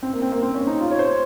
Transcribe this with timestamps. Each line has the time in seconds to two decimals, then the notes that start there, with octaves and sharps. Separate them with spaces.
0.03 C4
0.13 A#3
0.22 C4
0.32 A#3
0.42 C4
0.55 C#4
0.67 D#4
0.80 F4
0.91 C#5
0.99 C5